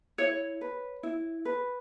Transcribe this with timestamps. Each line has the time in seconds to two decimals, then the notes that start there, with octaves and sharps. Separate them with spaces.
0.18 E4 C#5
0.61 B4
1.03 E4
1.45 B4